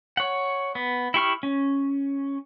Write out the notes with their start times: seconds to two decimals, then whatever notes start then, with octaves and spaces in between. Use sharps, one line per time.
0.17 C#5 F#5
0.75 B3
1.14 E4 G4 C#6 F6
1.43 C#4